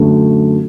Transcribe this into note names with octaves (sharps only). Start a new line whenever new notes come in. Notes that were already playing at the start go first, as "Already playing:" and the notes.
Already playing: F#2 D3 F#3 A3